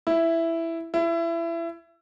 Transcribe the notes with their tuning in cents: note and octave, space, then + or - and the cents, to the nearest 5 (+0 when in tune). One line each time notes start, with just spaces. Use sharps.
E4 +5
E4 +25